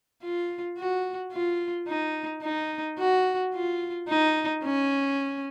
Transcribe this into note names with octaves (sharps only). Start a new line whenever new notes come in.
F4
F#4
F4
D#4
D#4
F#4
F4
D#4
C#4